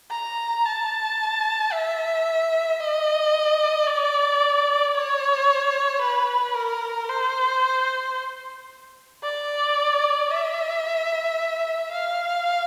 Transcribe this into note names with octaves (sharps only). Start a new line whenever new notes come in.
A#5
A5
E5
D#5
D5
C#5
B4
A#4
C5
D5
E5
F5